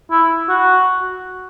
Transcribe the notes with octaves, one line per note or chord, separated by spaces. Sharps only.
E4
F#4